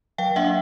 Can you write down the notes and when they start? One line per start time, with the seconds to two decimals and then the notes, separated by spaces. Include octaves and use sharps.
0.18 F#3 F5 G5
0.36 A#3 D4 E5 F#5